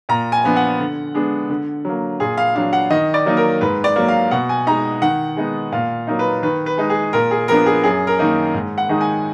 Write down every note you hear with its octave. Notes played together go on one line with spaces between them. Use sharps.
A#2 A#5
G#5
F3 B3 D4
F#5
D3
G#3 B3 D4
D3
F#3 A#3
A#2 G#4
F5
F#3 D4 F5
F#5
D#3 D#5
D5
F#3 A#3 D#4
A#4
G#2 B4
D5
F#3 A#3
F5
B2 F#5
G#5
G#3 D#4 A#5
D#3 F#5
G#3 B3 D#4
A#2 F5
F#3 A#3 D#4
B4
D#3 B4
B4
G#3 D#4
G#4
A#2 A#4
G#4
F3 B3 D4 A#4
G#4
F#2 G#4
A#4
D#3 A#3 D#4
G#2
F#5
D#3 G#3 D#4
G#5